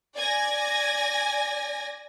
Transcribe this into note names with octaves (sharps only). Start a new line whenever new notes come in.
D5 G#5 G#6 A#6